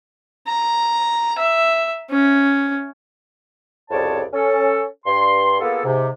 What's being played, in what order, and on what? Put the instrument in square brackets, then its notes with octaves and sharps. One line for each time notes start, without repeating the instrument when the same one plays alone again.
[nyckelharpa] A#5
E5
C#4
[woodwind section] C2 F2 C#3 C#5 D5 A5
C#4 A4
G2 C6
A#3 B3 F4 G#4 A4
G#2 C3